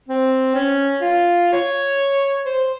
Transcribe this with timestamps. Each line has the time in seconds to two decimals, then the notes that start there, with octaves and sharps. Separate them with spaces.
0.09 C4
0.55 C#4
1.01 F4
1.53 C#5
2.46 C5